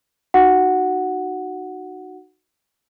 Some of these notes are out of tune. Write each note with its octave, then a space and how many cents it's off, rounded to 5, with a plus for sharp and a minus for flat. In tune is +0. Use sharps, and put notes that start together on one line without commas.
D#4 -25 F#4 +0 F#5 +0